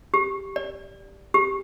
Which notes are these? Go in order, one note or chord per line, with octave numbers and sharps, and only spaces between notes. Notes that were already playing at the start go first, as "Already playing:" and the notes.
G4
D5
G4